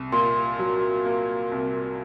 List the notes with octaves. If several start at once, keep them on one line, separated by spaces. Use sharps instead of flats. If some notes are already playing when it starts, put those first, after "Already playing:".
Already playing: C2
A#2 C6
F#3
A#3
C2